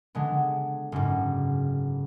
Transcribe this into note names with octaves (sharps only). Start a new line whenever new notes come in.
D3 G#3 B3
F#1 G#2